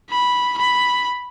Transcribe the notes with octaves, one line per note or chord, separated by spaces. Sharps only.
B5
B5